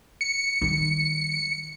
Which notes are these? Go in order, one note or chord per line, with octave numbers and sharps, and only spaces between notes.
C#7
D#3 G3